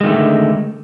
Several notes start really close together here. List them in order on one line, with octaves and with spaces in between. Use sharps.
G#3 D#3 A3 D3